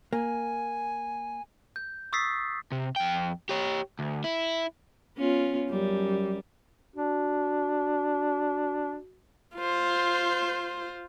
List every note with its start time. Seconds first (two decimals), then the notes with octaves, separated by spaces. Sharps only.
0.13 A#3 G#5
1.76 G6
2.13 C#6 D#6 E6 A6 B6 C7
2.72 C3
2.96 F2 G5
3.49 G4 C#5
3.99 D2
4.24 E4
5.17 B3 C#4 F4
5.69 F#2 G3
6.96 D4 F#4
9.56 F4 C5